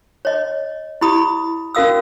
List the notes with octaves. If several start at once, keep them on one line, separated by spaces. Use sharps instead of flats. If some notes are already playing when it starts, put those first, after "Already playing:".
C#5 D#5
E4 G4 B5 D#6
C#4 F#4 A#4 F5 D#6 E6